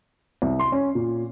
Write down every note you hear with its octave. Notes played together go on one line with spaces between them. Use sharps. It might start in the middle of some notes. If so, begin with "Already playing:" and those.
C2
C6
C#4
A#2